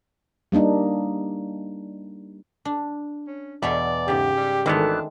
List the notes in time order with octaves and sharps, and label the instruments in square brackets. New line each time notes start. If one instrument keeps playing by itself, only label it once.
[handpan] G3 A#3 D4 D#4
[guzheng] D4
[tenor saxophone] C#4
[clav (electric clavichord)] E2 [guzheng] B2 C#5 C6 [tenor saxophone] D5
[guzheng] G#2 C#3 [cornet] G4
[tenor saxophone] G3
[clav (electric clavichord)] G#1 E3 B3 [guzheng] D#3 G#3 A3 [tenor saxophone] D4